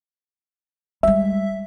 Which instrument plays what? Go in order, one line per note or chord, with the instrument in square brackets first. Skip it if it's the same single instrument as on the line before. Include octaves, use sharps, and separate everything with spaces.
[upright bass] G3 G#3 [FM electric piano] E5